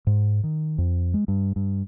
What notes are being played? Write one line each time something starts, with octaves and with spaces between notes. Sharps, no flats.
G#2
D#3
F2
G#3
G2
G2